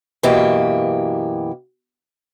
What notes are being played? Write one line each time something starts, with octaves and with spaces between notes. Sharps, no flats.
F#2 B2 E3 A#3 G4